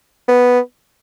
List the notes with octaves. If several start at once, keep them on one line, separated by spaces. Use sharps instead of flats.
B3